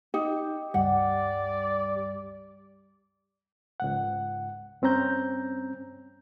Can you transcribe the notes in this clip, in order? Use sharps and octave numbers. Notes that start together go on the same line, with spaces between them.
D#4 G4
C#2 G2 G3 D5 F#5
C#2 G#2 F#5
G2 C4 C#4 A#5 G6